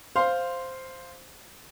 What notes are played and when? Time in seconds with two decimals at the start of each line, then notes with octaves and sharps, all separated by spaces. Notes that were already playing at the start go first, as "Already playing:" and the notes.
0.16 C5 F5 C6